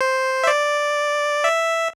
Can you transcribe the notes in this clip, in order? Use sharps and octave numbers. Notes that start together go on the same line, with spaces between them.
C5
E5
D5
E5